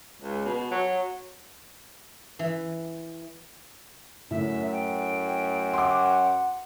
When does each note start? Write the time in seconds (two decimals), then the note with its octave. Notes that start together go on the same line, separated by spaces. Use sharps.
0.22 C#2
0.45 B2
0.71 F#3
2.39 E3
4.31 F#2 A2 E5
4.72 G5
5.74 F#5 C6 D6